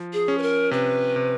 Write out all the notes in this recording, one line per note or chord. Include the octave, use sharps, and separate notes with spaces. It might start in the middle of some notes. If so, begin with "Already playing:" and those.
Already playing: F3
G#4
C#4
B4
A#4
C3 B4
C3